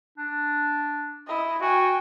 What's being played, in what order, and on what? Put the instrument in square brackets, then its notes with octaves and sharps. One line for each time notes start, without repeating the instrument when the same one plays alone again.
[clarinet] D4
[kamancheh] E4 D#5
[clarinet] F#4 [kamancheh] G5 G#5